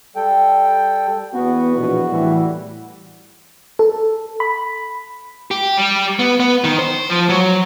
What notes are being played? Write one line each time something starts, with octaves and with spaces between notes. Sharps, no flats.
G3 A4 G5
E2 B3 F#4
A#1 B2
A2 E3 G3
A4
B5
G4
G3
B3
B3
D#3
C5
F3
F#3